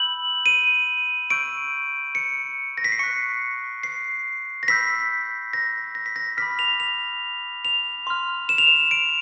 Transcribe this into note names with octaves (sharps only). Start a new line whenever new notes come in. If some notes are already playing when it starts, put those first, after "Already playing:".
Already playing: B5 E6 G6 F#7
D#7
C#6 E6 G6 D7
C#7
A#6
B6
C7
C#6 F#6 C#7
C7
A#6
B5 E6 G6 B6
A#6
A#6
B6
A#6
B5 D6 F6 B6
F7
F7
F7
C6 F6
E7
F7
E7
D7